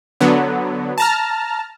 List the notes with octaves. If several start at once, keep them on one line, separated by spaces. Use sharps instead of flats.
D3 F#3 B3
A5 A#5 F6